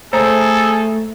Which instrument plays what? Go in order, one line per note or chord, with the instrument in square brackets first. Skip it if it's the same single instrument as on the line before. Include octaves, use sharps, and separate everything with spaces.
[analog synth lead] A3 [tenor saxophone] G#4 [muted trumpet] A4 [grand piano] C5 A#5